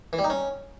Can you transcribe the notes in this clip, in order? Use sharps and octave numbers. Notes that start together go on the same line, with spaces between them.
E3
G3
D#4
C#4